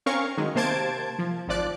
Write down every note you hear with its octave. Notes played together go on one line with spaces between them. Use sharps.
C4 C#4 A#4 F5 C#6
D#3 F#3 G#3
C3 A#3 C5 A5 G#6 D7
F3
G#1 F3 D5 F#6